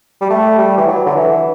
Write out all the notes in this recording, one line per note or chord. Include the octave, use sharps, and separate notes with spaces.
G3
A3
G3
E3
F#3
D3
E3